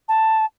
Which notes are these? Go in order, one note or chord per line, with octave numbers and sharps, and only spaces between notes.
A5